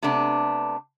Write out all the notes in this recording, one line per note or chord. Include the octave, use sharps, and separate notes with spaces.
C3 A3 B3 D4